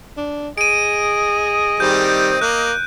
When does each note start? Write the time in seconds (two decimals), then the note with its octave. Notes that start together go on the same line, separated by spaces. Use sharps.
0.17 D4
0.58 G#4 D#5 D7 D#7
1.80 D#3 G3 C4 G6
2.42 A#3 F#6